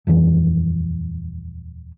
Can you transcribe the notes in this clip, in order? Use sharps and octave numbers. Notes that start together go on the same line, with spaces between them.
D#1 F2 E3